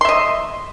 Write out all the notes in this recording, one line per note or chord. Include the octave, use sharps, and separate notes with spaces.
D#5 E5 C6